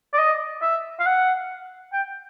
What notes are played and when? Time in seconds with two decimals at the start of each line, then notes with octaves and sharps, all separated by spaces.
0.13 D5
0.18 D#5
0.62 E5
0.99 F5
1.06 F#5
1.93 G5